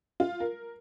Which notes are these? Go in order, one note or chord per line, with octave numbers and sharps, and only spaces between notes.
F4
A#4